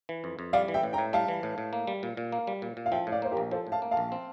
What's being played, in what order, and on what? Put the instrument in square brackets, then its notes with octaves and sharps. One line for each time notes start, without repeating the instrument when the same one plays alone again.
[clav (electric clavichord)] E3
F2
F2
[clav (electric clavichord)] G3 [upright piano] D5 F5
[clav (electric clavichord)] E3
[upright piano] E5 G5
[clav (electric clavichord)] A2
[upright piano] G5 A#5
[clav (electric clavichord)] A2
[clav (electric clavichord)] G3 [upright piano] F5 A5
[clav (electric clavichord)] E3
A2
A2
A#3
G3
A#2
A#2
A#3
G3
A#2
A#2
[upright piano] F5
[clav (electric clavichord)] F3 [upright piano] E5 G5
[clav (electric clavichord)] A2
[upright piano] D5 F5
[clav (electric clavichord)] A#3 [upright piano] C5
[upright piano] G4 A#4
[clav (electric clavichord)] A#1
[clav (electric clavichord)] F3 [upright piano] A4 C5
[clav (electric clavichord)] A2
[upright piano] F5 A5
[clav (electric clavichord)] A#3
[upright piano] F5 A5
[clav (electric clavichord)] A#1
C4